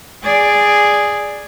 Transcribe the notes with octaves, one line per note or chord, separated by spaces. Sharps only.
G#4 D5